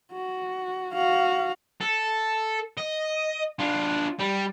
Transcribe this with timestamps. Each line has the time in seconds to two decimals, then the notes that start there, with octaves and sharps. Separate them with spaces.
0.13 F#4
0.93 F#4 F5
1.81 A4
2.77 D#5
3.59 D4 F4
4.20 G3